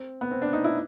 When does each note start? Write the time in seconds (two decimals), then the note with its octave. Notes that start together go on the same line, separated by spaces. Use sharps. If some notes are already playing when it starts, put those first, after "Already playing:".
Already playing: C4
0.21 B3
0.31 C4
0.42 D4
0.53 D#4
0.64 E4